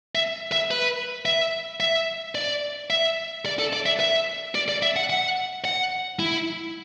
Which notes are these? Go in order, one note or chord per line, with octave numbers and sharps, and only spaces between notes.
E5
E5
B4
E5
E5
D5
E5
D5
A4
D5
E5
E5
D5
D5
E5
F#5
F#5
F#5
E4